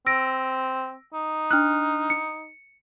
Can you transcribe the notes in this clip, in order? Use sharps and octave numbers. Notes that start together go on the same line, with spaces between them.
C4 E6 A#6 D7
D#4
D4 F6 F#6
C#7